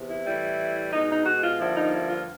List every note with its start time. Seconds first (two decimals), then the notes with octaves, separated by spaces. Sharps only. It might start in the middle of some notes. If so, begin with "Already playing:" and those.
Already playing: E2 C3
0.09 E4
0.26 A2 E3 G3
0.92 B2 G#3 D#4
1.10 D#4
1.26 F#4
1.42 F4
1.59 G2 D3 F3 A#3 E4
1.76 D#4
1.94 E4
2.10 F4